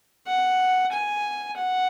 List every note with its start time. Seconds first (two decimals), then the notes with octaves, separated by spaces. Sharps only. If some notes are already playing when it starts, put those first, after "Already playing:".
0.27 F#5
0.92 G#5
1.57 F#5